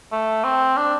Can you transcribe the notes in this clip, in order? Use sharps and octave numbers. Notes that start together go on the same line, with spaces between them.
A3
C4
D4